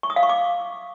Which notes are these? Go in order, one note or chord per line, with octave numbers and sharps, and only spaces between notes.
C#6
D#6
F5
C#6
D6